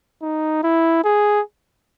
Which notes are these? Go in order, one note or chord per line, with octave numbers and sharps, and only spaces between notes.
D#4
E4
G#4